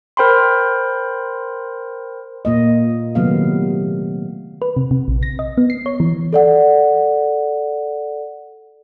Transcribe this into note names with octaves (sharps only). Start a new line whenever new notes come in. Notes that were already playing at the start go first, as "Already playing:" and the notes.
A#4 C5 G5 B5 C6
A#2 A#3 D#5
C3 D#3 F#3 A3 B3 F5
B4
C3
C3
A#1
A#6
D#5
B3
C7
C#5
E3
A4 D5 F#5